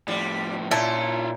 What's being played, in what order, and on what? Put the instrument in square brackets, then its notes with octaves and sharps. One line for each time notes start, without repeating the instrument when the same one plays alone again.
[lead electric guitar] A2 F3 [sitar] G3
[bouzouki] A#2 [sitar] C#4 [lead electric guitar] E4 F4 [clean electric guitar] E5 A5